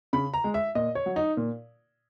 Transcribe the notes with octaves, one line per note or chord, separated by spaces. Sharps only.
C#3 B5
A#5
G#3
E5
A#2 D#5
C#5
F#3
D#4
A#2